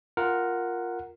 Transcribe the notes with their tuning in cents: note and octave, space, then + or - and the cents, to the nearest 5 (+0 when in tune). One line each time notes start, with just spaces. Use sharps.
F4 +0 A#4 +0 F#5 +0